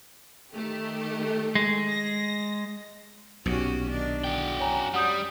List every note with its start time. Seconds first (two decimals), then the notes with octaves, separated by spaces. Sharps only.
0.53 D#3 A3 G4
1.55 G#3
1.90 A#6
3.46 B1 A#2 C#4 F#4 G4
3.90 D#3 D4
4.24 D3 F#4 G5
4.60 F#2 C#5 G#5 A#5
4.94 G3 F#5 D#6 G6